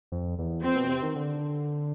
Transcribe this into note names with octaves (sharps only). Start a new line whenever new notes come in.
F2
E2
F2 C4
B2
C3
D#3
D3